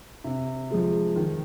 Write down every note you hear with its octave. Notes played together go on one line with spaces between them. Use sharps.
C3
F3 G#3
D#3